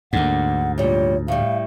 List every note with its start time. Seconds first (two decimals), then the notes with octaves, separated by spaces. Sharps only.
0.13 D2 G#2 D3 A#3 F#5
0.78 A#2 G3 C#5
1.28 A2 G3 F5